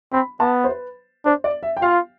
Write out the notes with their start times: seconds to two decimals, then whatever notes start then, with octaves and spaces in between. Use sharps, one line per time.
0.13 C4 B5
0.40 B3 A5
0.64 C5
0.69 B4
1.25 D4 C5
1.44 D5
1.63 E5
1.77 G5
1.82 F4 F5